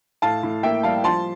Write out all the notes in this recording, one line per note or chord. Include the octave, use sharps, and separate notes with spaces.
A2 F5 A5
A2
A#3 E5 G5
G3 F5 A5
F3 A5 C6